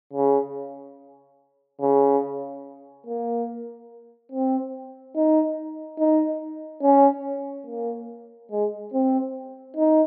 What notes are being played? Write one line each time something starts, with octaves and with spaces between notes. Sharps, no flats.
C#3
C#3
A#3
C4
D#4
D#4
C#4
A#3
G#3
C4
D#4